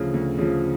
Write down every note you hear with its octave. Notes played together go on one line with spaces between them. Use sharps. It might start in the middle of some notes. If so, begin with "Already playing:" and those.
Already playing: D2 C#3 F3
D2
C#3 F3